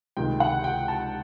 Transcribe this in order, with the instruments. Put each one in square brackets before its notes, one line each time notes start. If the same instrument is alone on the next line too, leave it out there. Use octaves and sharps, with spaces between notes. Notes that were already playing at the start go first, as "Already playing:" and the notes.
[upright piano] C#2 C3 D#3 G#3 G5
F#5
G5
A5